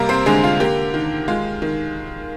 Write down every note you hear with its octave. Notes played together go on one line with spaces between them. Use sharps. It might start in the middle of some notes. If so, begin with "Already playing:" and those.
Already playing: C3 G3 A#3 A#4
C4 C5
D3 G#3 G#4
F4
A#3 G4
D#3
G#3 F4
D#3